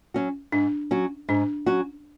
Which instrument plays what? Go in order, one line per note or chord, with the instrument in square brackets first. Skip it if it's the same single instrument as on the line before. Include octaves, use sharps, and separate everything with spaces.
[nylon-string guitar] F#3 C#4 F#4
[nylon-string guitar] G#2 [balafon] D4
[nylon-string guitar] F#3 C#4 F#4
[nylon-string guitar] G#2 [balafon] D4
[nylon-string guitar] F#3 C#4 F#4